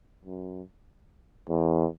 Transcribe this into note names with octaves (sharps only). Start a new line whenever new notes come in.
F#2
E2